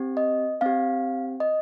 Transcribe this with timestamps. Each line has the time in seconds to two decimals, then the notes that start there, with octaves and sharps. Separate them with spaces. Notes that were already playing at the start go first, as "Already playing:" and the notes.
Already playing: C4 G4
0.17 D#5
0.61 C4 G4 F5
1.40 D#5